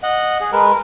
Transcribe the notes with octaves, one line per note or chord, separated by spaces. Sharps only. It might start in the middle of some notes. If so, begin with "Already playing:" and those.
D#5 F#5
G#4
G#3 A#4 B4